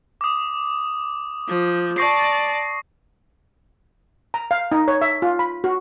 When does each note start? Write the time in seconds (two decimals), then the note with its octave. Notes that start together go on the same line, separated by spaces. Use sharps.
0.21 D6 D#6
1.49 F3
1.98 D5 A5 C#6 A#6 C7
4.34 A#5
4.51 F5
4.72 D#4
4.88 C#5
5.01 E5
5.22 F4
5.39 B5
5.64 F#4